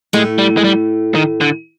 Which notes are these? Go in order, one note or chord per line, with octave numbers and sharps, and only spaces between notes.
A2 G#3 A3
G3
G#3
G3
D#3
D3